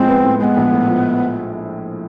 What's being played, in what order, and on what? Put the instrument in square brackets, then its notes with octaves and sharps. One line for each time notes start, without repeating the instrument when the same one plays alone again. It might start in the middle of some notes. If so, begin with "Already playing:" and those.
Already playing: [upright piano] A2 F3 G#3 [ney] C4
[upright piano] B3
A2
[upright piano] G#3 [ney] B3 C4
[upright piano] A#1
A2
F3